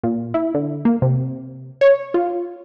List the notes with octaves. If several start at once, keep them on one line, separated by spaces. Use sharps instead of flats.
A#2
E4
D3
A#3
C3
C#5
F4